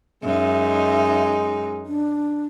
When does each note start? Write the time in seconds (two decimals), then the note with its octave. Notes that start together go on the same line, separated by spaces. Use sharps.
0.23 F#2 G#3 D#4 E5
1.86 D4